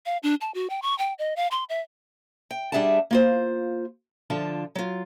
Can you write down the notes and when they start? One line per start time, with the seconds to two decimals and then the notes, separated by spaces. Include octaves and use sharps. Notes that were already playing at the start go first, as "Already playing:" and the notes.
0.06 F5
0.23 D4
0.41 A5
0.54 F#4
0.70 G5
0.82 C#6
0.98 G5
1.19 D#5
1.36 F5
1.51 C6
1.69 E5
2.51 G5
2.72 G3 D4 G#4 E5 F#5 A5
3.11 A#3 F4 C5
4.30 D3 F3 F4 A5
4.75 F#3 F4